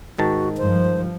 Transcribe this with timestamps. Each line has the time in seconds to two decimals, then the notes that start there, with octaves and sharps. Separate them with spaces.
0.18 G#2 D#3 F#4 A5
0.58 G2 F3 C5